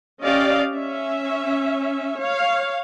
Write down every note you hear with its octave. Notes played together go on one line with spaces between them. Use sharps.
C#4 G4 D5 D#5 F5
C#4 E5
C#5 F5